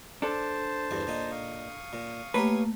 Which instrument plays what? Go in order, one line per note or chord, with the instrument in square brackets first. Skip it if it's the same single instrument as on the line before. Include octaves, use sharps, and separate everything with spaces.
[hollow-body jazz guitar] D4 A4 [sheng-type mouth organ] C5 A5
[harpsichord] E2 G2 E3
A#2 A#3 D#4
[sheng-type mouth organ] F5 C#6 D#6
[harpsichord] A#2
[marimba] A3 A#3 A#5 [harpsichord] G4 C#5 [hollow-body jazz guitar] B4